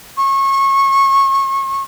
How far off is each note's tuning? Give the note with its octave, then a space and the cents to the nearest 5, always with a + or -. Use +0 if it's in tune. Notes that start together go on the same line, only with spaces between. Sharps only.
C#6 -25